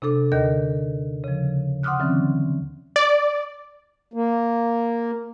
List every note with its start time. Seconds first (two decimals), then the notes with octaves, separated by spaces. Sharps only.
0.02 C3 D4 A4 D6
0.32 D#2 D3 A#4 D#5 G6
1.24 C#3 F3
1.83 F#5 C6 D6 D#6 F6 F#6
2.00 D3 E3 F#3 C4 C#4
2.96 D5
4.13 A#3